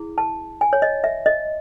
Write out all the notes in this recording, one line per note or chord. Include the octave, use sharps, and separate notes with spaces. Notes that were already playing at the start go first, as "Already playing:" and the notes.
Already playing: E4 G#4
A5
G#5
C#5
D#5
E5
D#5